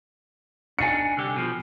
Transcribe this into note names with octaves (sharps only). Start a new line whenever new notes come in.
D4 D#4 G#5 C#7
C2 D3 G4
B2 F3